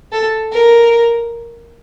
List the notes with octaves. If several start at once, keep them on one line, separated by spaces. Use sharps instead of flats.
A4
A#4